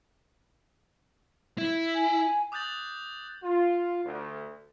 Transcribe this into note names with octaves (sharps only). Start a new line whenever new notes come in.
E4
G#5
D6 D#6 F#6 G6 A6 F#7
F4
D2